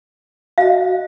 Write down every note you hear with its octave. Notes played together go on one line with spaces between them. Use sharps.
F#4 D#5 F5